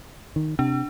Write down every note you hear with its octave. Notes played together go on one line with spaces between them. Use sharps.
D#3
C3 D4